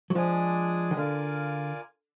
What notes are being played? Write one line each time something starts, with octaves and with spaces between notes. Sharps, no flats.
F#3
F3 G#3 D4 G#4 D5 G#5
D#3
D3 F4 A#4 D5 F5 G#5